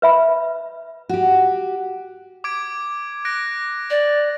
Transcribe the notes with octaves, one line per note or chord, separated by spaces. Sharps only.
B4 E5 B5
F#4 G4
D6 G#6 D7
F#6 A#6 D7
D5